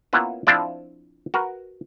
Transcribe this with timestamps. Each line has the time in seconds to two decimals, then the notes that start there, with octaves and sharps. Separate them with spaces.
0.13 A#3 B3 C#4 E4 F4 B4
0.47 F3 C4 D4 E4 F4 D5
1.34 F#4 A#4 B4